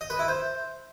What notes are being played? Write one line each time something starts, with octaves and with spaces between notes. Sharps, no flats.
D#5
B4
E4
C5